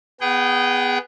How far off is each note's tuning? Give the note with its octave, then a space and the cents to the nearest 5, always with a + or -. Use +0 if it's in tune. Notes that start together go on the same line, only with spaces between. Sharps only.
B3 +0 G#4 -15 G5 -35